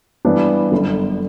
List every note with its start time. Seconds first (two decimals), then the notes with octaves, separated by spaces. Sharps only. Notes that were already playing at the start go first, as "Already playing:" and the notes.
0.25 G2 E3 B3 D4
0.72 G1 F#2 D3